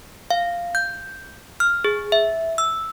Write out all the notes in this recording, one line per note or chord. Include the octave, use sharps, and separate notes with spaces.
F5
G6
F6
G#4
E5
E6